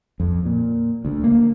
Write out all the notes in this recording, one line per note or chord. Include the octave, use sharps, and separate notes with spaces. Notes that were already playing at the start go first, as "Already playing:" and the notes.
F2
A#2
D2
A#3